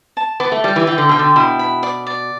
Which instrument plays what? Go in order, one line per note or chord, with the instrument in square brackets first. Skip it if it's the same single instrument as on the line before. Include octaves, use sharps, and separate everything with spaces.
[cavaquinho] A5
[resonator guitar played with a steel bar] B3 [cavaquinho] D6
[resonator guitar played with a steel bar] A3
[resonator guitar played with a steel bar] G3 [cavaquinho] D5
[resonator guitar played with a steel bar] E3
[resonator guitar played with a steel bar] E3 [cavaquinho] G5
[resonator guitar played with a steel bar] D3
[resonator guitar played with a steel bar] B2 [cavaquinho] G5
[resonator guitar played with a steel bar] D3
[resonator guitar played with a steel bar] B2 [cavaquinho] E4
[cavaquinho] B5
D5
D5